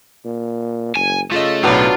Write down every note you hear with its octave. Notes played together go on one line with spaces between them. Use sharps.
A#2
F#1 G#5
C#3 A3 F4 D#5
B1 A2 F#3 B3 D4 F4